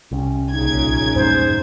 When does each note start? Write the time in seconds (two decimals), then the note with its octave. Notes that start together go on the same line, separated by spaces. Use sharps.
0.11 C2 C#4
0.52 A#1 C#3 D#4 G#6
1.16 E2 G2 G#3 C5